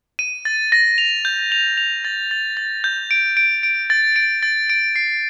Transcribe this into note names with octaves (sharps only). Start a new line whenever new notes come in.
D#7
A6
A#6
F7
G6
F7
F7
A6
A6
A6
G6
D7
D7
D7
A6
D7
A6
D7
C7